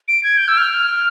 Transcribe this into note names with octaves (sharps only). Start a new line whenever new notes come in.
D7
G#6
G6
E6
F6